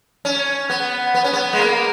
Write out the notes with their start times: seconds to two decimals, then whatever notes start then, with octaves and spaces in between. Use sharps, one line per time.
0.25 C#4
0.70 B3
1.15 B3
1.24 C#4
1.33 B3
1.53 G#3
1.59 A#3